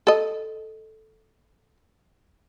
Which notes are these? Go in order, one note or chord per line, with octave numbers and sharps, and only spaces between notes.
A4 D#5